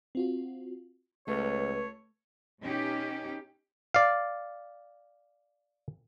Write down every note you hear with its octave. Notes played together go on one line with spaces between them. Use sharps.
C4 F4 F#4
C#2 A3 B4 C#5
B2 C#4 D#4 G4
D5 F5